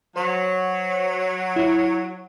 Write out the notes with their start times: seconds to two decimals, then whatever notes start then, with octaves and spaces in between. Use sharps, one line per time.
0.16 F#3 C5
1.56 E4